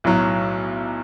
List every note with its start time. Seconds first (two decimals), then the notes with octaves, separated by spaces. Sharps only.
0.04 B1 A2 F#3